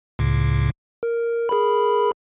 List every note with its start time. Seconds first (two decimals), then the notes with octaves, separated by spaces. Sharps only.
0.19 C#2 A2 C#3
1.03 A#4
1.49 G#4 A#4 B5